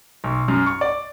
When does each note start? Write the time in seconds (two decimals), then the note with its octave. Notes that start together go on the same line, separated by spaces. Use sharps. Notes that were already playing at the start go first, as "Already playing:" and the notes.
0.24 B1
0.48 F#2
0.66 C#6
0.81 D5